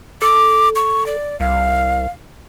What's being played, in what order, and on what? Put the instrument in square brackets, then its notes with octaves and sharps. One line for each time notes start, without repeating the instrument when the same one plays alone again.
[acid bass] A4 [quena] D6
[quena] C#6
D5
[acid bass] C2 [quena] F5